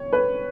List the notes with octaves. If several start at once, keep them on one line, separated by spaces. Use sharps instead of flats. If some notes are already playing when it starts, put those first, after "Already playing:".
Already playing: C#5
B4